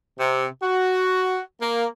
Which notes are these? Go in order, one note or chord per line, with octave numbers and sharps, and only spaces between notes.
C3
F#4
A#3